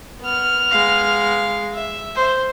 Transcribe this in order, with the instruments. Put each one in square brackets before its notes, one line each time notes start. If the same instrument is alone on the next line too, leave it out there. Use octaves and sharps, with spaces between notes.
[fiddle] B3 F6
[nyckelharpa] G#3 F5
[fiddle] E5
[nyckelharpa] C5